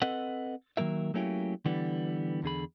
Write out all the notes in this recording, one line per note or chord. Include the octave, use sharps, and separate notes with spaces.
C4 A4 B4 D#5 F#5
D#3 F#3 A#3 A#4 E5
F#3 A3 A#3 C#4 E4 G4
D3 E3 G3 B3
E2 D3 G#4 B5